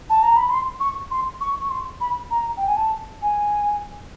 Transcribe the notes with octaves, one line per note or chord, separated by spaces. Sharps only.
A5
A#5
B5
C6
C#6
C6
C#6
C#6
C6
B5
A#5
G5
G#5
A5
G#5